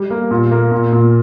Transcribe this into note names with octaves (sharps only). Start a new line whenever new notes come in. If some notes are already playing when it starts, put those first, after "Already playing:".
Already playing: G3
A#3
A#2
A#3
A#2
A#2